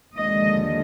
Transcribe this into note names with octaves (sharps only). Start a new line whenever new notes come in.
D#2 D3 F3 G#3 D#5